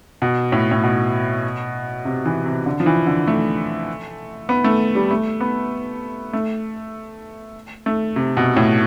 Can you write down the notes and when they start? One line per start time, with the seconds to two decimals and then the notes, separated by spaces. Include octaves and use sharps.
0.22 B2
0.52 A2
0.71 A2
0.83 B2
2.05 C3
2.25 E3
2.46 C3
2.66 D3
2.80 F3
2.86 E3
3.07 D3
3.27 A3
4.49 B3
4.64 A3
4.95 G3
5.11 A3
5.41 B3
6.33 A3
7.86 A3
8.16 C3
8.37 B2
8.56 A2